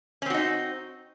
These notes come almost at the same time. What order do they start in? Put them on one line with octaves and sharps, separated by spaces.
C#4 C4 F#4 D#4